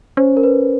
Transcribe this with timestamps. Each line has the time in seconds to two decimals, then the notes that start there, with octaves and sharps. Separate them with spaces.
0.17 C#4 C5
0.37 A#4
0.43 B4